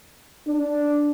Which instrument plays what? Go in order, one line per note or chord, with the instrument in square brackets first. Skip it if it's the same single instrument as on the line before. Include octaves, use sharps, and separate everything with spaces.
[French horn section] D4